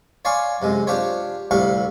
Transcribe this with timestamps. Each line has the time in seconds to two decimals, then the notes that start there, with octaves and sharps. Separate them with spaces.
0.25 C#5 D5 F5 G#5 C6 C#6
0.62 F#2 C3 G#3
0.87 D4 F4 G4 C5 C#5
1.51 D2 A2 C3 G3 F5 C#6